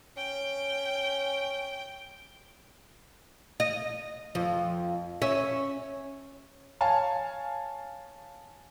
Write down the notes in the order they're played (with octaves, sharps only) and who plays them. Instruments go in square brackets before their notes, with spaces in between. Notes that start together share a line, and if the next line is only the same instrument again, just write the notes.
[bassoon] C#4 [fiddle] G5
[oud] D#5
F2 F3
C#4 E5
[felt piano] C#5 F5 G#5 A5